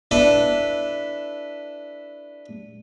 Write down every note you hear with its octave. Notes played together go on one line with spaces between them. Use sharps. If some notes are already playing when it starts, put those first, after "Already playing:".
D4 E4 A4 B4